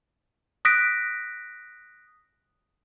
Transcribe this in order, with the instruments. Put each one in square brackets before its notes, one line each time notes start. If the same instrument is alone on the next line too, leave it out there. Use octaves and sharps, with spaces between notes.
[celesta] D#6 F#6 A#6 B6 D7